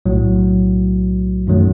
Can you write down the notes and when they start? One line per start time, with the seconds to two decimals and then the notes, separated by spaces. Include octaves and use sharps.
0.06 B1 A2 F#3
1.47 F#2 D#3 F#3 A3